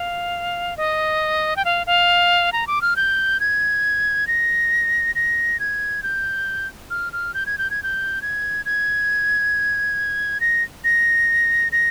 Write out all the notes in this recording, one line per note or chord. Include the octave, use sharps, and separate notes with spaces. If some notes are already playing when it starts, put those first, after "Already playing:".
Already playing: F5
D#5
G5
F5
F5
A#5
D6
F6
G6
G#6
A#6
A#6
G#6
G6
F6
F6
G6
G#6
G6
G#6
G6
G#6
G#6
A#6
A#6
A#6